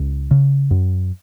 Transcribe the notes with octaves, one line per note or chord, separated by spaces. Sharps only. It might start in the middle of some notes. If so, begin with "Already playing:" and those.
Already playing: C#2
C#3
F#2